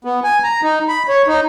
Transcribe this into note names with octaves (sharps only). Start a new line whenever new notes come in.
B3
G#5
A#5
D#4
B5
C#5
D#4